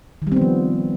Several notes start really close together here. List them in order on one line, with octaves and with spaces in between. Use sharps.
D#3 G3 C4 B3 F3